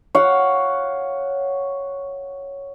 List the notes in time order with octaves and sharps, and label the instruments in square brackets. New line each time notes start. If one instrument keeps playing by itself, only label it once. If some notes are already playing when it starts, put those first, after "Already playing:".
[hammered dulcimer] C#5 F5 F#5